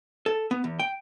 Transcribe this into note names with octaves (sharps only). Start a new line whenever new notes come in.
A4
B3
E2
G5